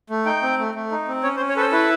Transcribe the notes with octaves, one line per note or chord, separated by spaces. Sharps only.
A3
D#4 G5
C4
A3
A3
D#4
C4
C#4 C#5
C5
C#4
C#5
A4 B4 C5
E4 B4